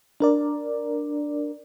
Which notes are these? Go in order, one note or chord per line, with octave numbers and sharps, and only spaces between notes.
D4 A#4 D5